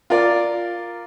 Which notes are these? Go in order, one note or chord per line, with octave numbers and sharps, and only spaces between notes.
F4 A#4 D5